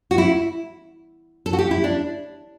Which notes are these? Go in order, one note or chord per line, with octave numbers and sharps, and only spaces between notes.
F#4
E4
A4
F#4
G4
E4
D4